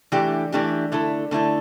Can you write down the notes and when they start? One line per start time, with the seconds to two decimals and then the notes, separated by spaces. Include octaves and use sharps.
0.12 E3 A3 D4 G4
0.52 E3 A3 D4 G4
0.92 D3 A3 E4 A4
1.31 D3 A3 E4 A4